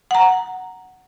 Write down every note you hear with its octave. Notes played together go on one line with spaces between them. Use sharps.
F#5 A#5